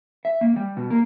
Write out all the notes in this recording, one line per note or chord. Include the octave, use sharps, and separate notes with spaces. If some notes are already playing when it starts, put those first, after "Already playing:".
E5
A#3
G3
B2
A#3